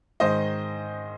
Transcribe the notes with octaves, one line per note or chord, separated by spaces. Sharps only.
G#2 D#3 C5 D#5